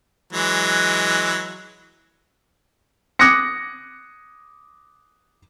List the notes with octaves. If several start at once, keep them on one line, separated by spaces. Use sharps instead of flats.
E3 F#3 G#3
D6 D#6 F#6 G#6 A#6 C#7